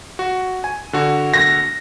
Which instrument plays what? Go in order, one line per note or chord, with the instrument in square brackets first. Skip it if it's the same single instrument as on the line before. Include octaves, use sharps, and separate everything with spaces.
[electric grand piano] F#4
G#5
D3 F#4
[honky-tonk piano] A#6